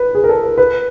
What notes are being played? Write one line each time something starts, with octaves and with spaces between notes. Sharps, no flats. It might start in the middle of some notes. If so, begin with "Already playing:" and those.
Already playing: B4
G#4
A#4
A4
A#4
B4